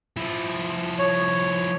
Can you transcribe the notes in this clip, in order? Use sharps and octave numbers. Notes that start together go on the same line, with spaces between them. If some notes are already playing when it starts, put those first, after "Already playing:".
F3 E4
C#5